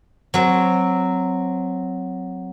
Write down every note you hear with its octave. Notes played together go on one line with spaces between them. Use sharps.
F#3 C4